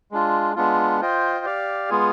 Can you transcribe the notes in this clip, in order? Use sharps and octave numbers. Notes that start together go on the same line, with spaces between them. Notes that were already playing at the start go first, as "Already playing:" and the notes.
G#3 D4 F4
G#3 B3 D4 F4
F4 C5 D#5 G5
G4 D5 F5
G#3 B3 F4 G#4